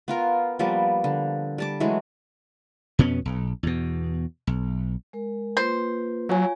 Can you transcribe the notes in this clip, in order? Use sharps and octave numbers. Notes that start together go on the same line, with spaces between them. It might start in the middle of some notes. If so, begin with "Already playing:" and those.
B3 F4 A#4
F3 G3 A#3 B3
D3
G3 A5 D6
E3 F#3 G#3 A3
F2 B2 B3 C#4
B1
E2 B2
B1
G#3 A#4
A#3 F4 B4 C5
F#3 F4 C#5 G#5